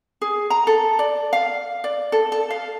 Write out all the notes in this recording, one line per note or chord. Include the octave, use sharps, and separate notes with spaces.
G#4
A#5
A4
D5
F5
D5
A4
A4
F5